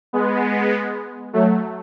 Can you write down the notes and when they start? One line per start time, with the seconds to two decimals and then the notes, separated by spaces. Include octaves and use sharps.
0.13 G#3 B3
1.33 F#3 A3